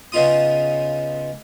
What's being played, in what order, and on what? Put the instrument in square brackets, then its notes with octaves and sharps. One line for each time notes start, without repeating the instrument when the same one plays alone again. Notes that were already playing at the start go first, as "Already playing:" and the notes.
[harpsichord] C#3 B3 D#4 F4 C6 D#6